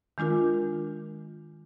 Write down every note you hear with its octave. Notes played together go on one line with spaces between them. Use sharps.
D#3 G#3 D4 F4 A#4